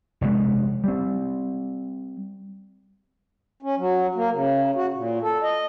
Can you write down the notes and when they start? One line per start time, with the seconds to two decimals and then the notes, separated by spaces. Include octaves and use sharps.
0.21 F1 B2 G#3
0.84 G3 C4
3.62 C#4
3.77 F#3
4.15 A#3
4.31 C#3
4.75 F#4
4.94 A#2
5.22 A4
5.43 D#5